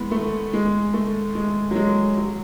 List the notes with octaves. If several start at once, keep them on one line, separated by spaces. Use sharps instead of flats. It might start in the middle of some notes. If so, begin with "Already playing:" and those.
Already playing: E3 G#3 B3
A3
G#3
A3
G#3
F#3
G#3
F#3